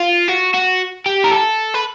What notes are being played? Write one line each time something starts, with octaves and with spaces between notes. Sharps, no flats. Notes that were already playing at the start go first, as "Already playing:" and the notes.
Already playing: F4
F#4
F#4
G4
A#4
A4
B4